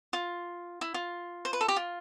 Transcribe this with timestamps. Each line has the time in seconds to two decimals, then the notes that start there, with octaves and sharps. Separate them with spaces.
0.13 F4
0.81 E4
0.94 F4
1.45 C5
1.53 B4
1.61 A4
1.68 G4
1.76 F4